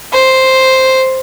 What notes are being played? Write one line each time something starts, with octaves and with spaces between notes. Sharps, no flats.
C5